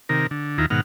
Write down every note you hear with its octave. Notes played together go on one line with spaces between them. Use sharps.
C3 D#3 A#4
D3
D#2 D#3 E4 F4 A#5
G#2 B2 D#3 F#5 F6